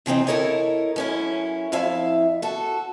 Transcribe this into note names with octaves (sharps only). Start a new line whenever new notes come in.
C3 E3 C4 D#4
E4 A4 A#4 C#5 D#5
F#2 C#4 E4
F2 E4 E5 F5
F#4 A4